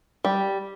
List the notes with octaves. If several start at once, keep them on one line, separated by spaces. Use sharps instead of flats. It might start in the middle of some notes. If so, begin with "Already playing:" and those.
G3